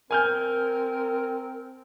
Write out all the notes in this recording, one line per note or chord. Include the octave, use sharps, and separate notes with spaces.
C4 A#4 G#5 F6 G6